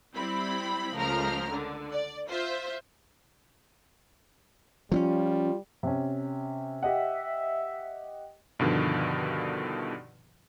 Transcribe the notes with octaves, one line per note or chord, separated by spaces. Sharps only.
G3 C4 E4 B5
C#2 F3 A3 A#4 A#5 F6
D3
D5
F4 C5 E5
F3 G3 C4 C#4 F4
C3 C#4
G4 D#5 E5 F#5
G2 B2 D3 D#3 F3